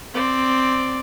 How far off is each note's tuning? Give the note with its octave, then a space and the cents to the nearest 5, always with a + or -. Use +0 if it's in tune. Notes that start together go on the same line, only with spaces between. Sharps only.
C4 +0 D5 +0